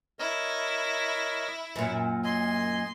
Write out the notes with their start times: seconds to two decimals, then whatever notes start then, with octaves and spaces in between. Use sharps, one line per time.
0.19 E4 A#4 C#5 D#5
1.76 F#2 A#2
2.24 D#5 G#5 C6